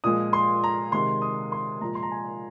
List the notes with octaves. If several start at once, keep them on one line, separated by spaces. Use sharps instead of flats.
A#2 F3 G#3 D#6
C6
A#5
C3 D#3 G#3 C6
D#6
C6
A#2 F3 G#3 A#5
C6
A#5
G#5